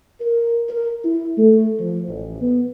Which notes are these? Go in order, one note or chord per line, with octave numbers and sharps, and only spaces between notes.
A#4
A#4
E4
A3
F3
A1
B3